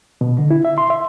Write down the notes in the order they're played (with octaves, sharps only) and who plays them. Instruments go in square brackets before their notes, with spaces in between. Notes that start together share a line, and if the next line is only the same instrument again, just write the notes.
[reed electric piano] B2
D3
E4
E5
C6
E5